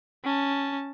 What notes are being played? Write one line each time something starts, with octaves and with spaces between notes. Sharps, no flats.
C#4 A5